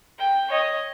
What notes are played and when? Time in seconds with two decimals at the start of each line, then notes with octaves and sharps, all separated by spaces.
0.19 G5
0.49 C#5 D#5